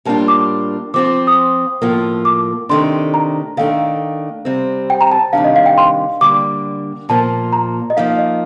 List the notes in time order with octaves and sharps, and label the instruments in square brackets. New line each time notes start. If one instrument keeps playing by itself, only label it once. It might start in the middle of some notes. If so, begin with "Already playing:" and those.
[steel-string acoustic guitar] A2 G3 A#3 D4 F4 [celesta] A5
[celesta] D6
[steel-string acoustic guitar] F3 C4 F4 [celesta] D6
[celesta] D6
D#6
[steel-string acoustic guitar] A2 F3 A#3 F4
[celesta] D6
[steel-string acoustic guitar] C3 D#3 A3 D4 [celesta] C6
[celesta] A#5
[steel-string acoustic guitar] D#3 A3 D4 [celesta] F5
[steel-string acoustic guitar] C3 G3 C4
[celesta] G5
A#5
A5
[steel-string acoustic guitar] C3 D#3 G3 D4 [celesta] F5
[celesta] D#5
F5
G5
C6
[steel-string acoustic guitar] D3 G3 A#3 D4 [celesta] D6
[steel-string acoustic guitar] A#2 F3 A#3 F4 [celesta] A5
[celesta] A#5
D#5
[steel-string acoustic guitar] F3 A#3 D#4 [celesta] F5
[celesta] D#5